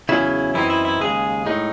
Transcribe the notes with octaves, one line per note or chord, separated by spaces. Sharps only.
E2 C#3 F#3 C#4 E4
F#2 E3 C4 D#4 E4
E4
E4
D#2 C#3 G#3 G#4
A2 G#3 D#4